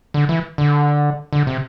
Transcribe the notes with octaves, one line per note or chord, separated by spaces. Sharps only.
D3
E3
D3
D3
C3